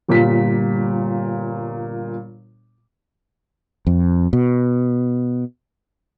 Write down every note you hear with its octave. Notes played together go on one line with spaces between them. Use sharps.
G1 A#2 G3 B6
F2
B2